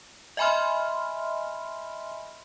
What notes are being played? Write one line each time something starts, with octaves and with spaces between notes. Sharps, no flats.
D#5 E5 G#5 B5 C6 F6